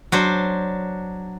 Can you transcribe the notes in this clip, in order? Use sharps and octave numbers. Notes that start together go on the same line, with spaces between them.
F#3 D4 C5